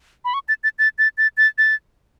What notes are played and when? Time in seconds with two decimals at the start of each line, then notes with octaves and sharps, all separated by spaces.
0.25 B5
0.34 C#6
0.49 A6
0.64 A6
0.79 A6
0.98 A6
1.18 A6
1.37 A6
1.58 A6